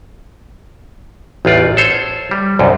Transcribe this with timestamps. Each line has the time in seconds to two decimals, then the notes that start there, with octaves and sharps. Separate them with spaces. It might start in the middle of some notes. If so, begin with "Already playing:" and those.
1.45 A1 E2 F4 D5
1.77 A4 C5 C#5
2.31 G3
2.59 C2 F#2